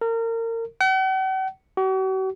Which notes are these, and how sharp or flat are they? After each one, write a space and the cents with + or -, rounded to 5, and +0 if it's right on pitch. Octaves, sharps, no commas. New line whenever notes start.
A#4 -30
F#5 +45
F#4 +45